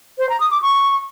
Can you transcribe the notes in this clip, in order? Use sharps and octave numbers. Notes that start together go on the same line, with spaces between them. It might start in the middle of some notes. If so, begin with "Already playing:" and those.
C5
A#5
D#6
D6
C#6